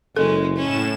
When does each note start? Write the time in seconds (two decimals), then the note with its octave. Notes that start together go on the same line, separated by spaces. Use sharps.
0.16 F#1 G#3 C#4 A4
0.57 A2 C#4 E7